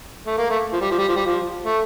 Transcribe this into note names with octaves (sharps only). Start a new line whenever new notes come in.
A3
A#3
A3
F3
G3
F3
G3
F3
G3
F3
A3